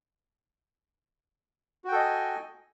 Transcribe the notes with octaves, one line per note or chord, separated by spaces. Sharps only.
F#4 A4 D#5 G5 G#5